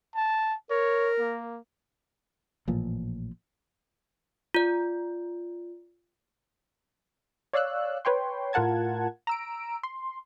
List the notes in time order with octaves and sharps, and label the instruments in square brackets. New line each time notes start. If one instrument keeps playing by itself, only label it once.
[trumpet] A5
[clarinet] A#4 [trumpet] C#5
[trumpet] A#3
[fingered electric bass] A1 A#2 F3
[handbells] F4 D5
[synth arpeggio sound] C#5 D5 F5 E6 F#6
B4 C#5 G5 C6
A2 F4 A#4 F#5 A5 G#6
A#5 E6 D7
C6